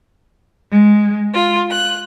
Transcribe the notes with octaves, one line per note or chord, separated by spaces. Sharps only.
G#3
F4
F#6